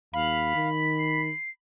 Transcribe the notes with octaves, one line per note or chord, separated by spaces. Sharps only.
D#2 F5 B5
D#3
C7